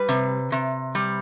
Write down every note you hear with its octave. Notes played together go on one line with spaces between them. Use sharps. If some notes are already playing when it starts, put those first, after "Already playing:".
Already playing: G3 B4
C3
C3
G3